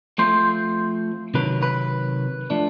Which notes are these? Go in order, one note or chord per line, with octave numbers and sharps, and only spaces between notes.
F3 A3 C4 C5
C3 D#3 F#3 B4
B4
F3 A3 D4